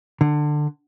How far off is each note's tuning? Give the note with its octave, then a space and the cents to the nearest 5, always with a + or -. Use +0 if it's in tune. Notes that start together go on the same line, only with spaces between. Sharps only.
D3 +20